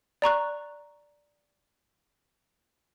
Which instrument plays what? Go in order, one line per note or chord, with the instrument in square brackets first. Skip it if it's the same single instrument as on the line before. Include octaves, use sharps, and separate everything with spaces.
[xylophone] D5 A#5 C#6 F#6